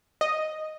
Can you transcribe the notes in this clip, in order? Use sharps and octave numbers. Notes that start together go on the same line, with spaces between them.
D#5